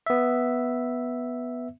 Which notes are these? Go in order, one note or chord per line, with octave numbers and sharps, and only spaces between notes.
B3 E5